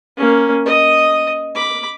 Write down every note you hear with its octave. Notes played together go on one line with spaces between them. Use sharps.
A#3 C#4
D#5 D#6
B5 D6